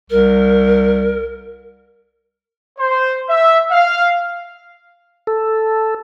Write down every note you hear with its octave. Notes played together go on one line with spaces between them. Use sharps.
C2 A#4
C5
E5
F5
A4